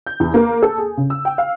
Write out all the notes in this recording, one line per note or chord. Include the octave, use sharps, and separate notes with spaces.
G6
E2
A#3
A4
G#4
C#3
E6
G5
F5